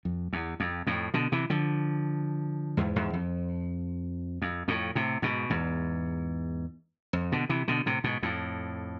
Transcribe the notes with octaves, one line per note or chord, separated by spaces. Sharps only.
F2
E2
F2
F2 A2
B2 D3
C3 E3
D3 F3
E2 G#2
E2 G#2
F2
F2
F2 A2
A2 C3
G#2 B2
E2 G#2
F2
B2 D3
C3 E3
B2 D3
A2 C3
G#2 B2
F2 A2